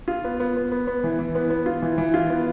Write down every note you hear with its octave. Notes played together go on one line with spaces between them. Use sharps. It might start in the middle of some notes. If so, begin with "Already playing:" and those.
F4
B3
B3
B3
B3
B3
E3
E3
B3
B3
F4
E3
E3
F4
B3